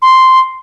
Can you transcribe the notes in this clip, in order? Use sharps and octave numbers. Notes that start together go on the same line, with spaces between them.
C6